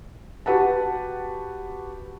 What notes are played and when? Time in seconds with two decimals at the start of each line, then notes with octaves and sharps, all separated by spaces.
0.46 F#4 G4 B4 F#5 A5